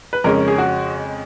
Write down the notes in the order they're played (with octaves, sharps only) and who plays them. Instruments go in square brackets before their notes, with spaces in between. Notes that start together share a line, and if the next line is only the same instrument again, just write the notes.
[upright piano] B4
F2 C#3 G#3 C#4 A#4
G#4
F#4